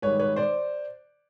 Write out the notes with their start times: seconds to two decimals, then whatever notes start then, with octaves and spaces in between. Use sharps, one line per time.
0.02 G#2 D#3 G3 B4 C#5
0.19 B4 C#5
0.36 C5 D5